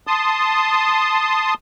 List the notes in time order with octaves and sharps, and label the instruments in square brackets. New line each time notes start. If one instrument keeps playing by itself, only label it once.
[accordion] A5 C6 D#6